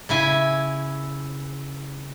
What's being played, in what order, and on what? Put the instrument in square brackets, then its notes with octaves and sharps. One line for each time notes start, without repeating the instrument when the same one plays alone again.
[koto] C#3 E4 G#5